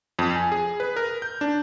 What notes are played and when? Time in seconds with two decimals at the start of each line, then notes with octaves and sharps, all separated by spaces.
0.19 F2
0.36 G#5
0.52 G#4
0.80 B4
0.96 A#4
1.22 G6
1.41 D4